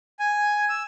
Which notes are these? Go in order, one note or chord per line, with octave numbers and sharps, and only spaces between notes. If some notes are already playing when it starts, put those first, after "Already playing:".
G#5
E6